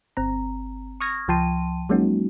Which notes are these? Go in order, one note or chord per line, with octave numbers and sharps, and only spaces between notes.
G1 C4 A#5
C#6 D#6 F6 G#6 A#6
C#2 F3 G5 A5 C6 D#7
F#3 G#3 A#3 C#4 D#4 F#4